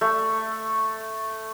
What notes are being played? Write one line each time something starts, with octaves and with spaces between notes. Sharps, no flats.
A3